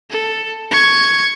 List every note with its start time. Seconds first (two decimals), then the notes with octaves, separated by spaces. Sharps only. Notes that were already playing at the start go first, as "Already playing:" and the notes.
0.11 A4
0.71 C#6 G#6